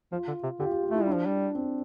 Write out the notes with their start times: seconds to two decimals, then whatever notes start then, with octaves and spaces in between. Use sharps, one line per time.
0.12 F3 F4
0.27 D3
0.43 C3
0.59 D3 G4
0.65 F4
0.72 G4
0.83 F4
0.91 A3 E4
1.02 G3 D4
1.15 F3
1.26 G3
1.55 C4